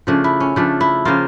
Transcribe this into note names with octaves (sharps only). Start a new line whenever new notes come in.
C#3 F3 A3 D4
E4
C#4
C#3 F3 A3 D4
E4
C#3 F3 A#3 F4